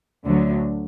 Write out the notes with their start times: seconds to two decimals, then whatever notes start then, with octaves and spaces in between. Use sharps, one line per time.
0.24 D2 D3 F#3